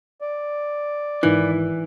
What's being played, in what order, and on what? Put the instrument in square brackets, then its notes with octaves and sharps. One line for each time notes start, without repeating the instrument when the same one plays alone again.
[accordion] D5
[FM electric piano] G#1 D#3 [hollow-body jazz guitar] E3